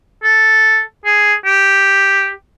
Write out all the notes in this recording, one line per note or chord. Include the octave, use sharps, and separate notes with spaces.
A4
G#4
G4